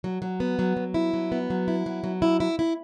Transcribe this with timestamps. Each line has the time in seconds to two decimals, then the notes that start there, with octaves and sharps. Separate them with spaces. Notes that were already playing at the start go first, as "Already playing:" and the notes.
0.04 F#3
0.22 F#3
0.40 B3
0.59 F#3
0.77 F#3
0.94 E4
1.14 F#3
1.32 B3
1.50 F#3
1.68 E4
1.86 F#3
2.04 F#3
2.22 E4
2.40 E4
2.59 E4